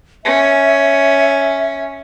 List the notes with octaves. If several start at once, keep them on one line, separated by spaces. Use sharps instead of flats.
C#4 E5